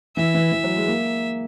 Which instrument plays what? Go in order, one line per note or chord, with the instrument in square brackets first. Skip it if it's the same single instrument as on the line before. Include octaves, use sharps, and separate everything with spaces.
[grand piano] E3 [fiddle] E5
[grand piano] E3
E3
F#3
G#3
A#3